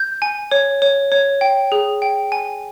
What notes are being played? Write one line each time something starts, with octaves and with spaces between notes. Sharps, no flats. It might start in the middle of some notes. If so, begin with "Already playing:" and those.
Already playing: G6
G#5
C#5
C#5
C#5
G5
G#4
G5
G#5